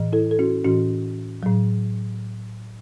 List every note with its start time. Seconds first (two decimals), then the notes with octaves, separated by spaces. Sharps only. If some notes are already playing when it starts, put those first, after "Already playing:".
Already playing: A2 E3
0.13 E4 A4
0.31 A4
0.39 C#4 F#4
0.65 A2 E3 C#4 F#4
1.43 A2 F#3